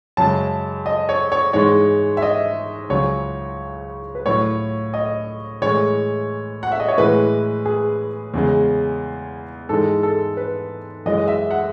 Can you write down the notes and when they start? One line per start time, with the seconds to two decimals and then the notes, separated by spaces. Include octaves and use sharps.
0.17 F#2 C#3 G#3 A5
0.86 D#5
1.09 C#5
1.32 C#5
1.53 G#2 E3 G#3 C#5
2.17 E5
2.22 D#5
2.89 C#2 C#3 F#3 C#5
4.15 B4
4.25 A2 F#3 C#5
4.94 D#5
5.62 A2 E3 G#3 C#5
6.63 F#5
6.72 E5
6.80 D#5
6.88 C#5
6.98 A2 E3 G#3 B4
7.66 G#4
8.34 E2 C#3 G#3
9.69 G#2 E3 G#3 A4
10.03 A4
10.37 B4
11.06 F#2 E3 G#3 D#5
11.28 E5
11.51 F#5